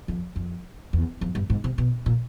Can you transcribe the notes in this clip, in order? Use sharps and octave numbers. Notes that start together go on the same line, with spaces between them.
F2
F2
E2
F2
G2
G#2
C3
B2
A#2